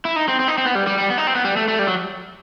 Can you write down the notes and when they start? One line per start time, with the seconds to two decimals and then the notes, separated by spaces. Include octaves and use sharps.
0.05 E4
0.16 D#4
0.28 C4
0.40 C4
0.48 D#4
0.58 C4
0.66 B3
0.75 G3
0.87 G3
0.98 G3
1.10 B3
1.18 D#4
1.27 C4
1.35 B3
1.45 G3
1.57 A3
1.68 A3
1.79 G3
1.88 F#3